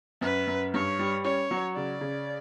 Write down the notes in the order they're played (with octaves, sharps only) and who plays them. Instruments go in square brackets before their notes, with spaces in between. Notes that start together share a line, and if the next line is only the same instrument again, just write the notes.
[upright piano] F#2 [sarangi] B4
[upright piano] F#2
[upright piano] G2 [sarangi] C#5
[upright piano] G3
[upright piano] C#4 [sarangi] C#5
[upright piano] F#3
[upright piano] C#3 [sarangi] D5
[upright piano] C#3